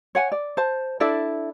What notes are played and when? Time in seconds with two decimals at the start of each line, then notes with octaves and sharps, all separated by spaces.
0.15 C#5 F#5 G#5
0.32 D5
0.57 C5 A5
1.00 D4 E4 A4 D5